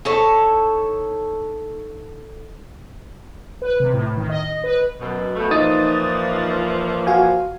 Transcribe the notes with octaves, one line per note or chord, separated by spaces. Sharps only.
D#4 E4 A4 C#5
B4
C3
A2
D#3
D#5
B4
F#2 B2
B2 F3 A3
A#2 E3 F3 D#4 D#6 A6
F#4 F5 G#5